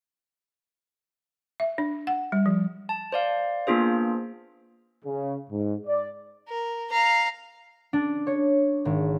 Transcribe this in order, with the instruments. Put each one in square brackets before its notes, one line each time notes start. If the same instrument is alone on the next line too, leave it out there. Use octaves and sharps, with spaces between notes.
[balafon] E5
D4
F#5
G3
F3
[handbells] A5
C5 D5 F5
A#3 B3 D4 F4 G#4 C5
[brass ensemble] C#3
G#2
D5
[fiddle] A#4
F5 A#5
[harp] D4
C#5
G#1